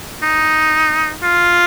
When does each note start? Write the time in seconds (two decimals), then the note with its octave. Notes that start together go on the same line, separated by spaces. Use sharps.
0.23 D#4
1.23 F4